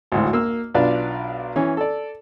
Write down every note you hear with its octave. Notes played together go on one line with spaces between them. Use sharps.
G#1 D2 A2
A#3 E6
B1 D4 F4 B4 D5 F5
E3 C#4
A4 D5